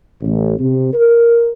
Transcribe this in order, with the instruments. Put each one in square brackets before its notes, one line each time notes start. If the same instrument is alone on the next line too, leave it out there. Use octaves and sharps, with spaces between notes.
[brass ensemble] A1
C3
A#4